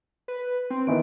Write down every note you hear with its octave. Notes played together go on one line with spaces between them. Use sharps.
B4
C4
D#3 E3 B3 D7